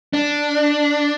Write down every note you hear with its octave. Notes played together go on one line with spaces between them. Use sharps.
D4